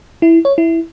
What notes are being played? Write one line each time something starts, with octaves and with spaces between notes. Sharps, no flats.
E4
C#5
E4